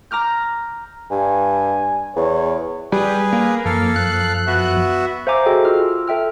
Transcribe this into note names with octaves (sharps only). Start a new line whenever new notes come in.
A#5 D6 F6 G6
G2 G#5
E2 C#5
G3 G#4 B4
A#3
F#2 F3 A4 F5
F#6
B3 F#4 E5
C5 E5 F5 G#5 A#5 D6
F#4 G#4 A4 D#5 G5
F4 E6 F6
A4 E5 G5 F6